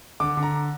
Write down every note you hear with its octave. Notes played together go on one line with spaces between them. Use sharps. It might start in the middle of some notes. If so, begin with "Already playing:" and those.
D3 D6
D3
A#5